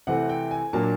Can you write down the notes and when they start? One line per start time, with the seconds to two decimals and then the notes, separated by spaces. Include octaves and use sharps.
0.07 C3 E3 A3 C4 F#5
0.29 G5
0.51 G#5
0.73 A#2 F#3 A#3 D4 A5